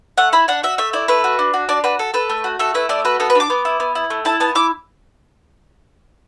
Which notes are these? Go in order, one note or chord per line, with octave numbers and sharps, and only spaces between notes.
A3 F#5
E4 B5
D4 F#5
F#4 E5
A3 E5
E4 D5
A3 B4
F#4
D4
F#4
D4 D5
F#4 B4
A4
A4 B4
A3
F#4
A3 A4
E4 B4
A3 D5
F#4 B4
B3 A4
B4
D4 D6
B3
E4
B3
E4
A3
E4 A5
B3 A5
E4 D6